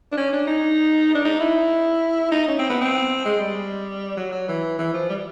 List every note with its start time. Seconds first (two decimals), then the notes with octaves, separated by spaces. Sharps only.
0.12 D4
0.17 C#4
0.33 D4
0.47 D#4
1.15 D4
1.25 D#4
1.40 E4
2.32 D#4
2.48 C#4
2.59 C4
2.69 B3
2.81 C4
3.25 G#3
3.40 G3
4.17 F#3
4.32 F#3
4.48 E3
4.78 E3
4.93 F3
5.10 G3